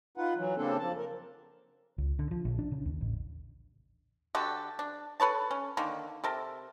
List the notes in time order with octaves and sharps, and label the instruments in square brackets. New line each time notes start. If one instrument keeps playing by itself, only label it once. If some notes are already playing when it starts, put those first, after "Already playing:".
[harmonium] D#4 F4 B4 F#5
E3 F#3
C#3 A#3 C4 D4 A4
F2 F3 A5
A#4
[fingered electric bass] C#2
D3
F3
A#1
D4
C#3
D#2
A1
[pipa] D3 F#4 G4 A4
D4
A4 B4 C#5 A5
C#4
D3 D#3 A#3
C3 A4 A#4